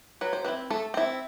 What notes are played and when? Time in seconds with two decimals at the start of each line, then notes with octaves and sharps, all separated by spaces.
0.21 F#3 B4
0.33 C5
0.44 C4 E4 B4
0.70 A3 A4
0.94 C4 E4